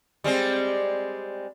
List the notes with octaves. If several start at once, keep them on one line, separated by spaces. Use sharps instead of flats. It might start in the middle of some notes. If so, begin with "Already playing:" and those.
G3 G#3 C4